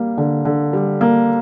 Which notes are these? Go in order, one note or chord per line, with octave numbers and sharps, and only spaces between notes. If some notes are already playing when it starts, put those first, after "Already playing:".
Already playing: G3 A#3
D3
D3
G3
A#3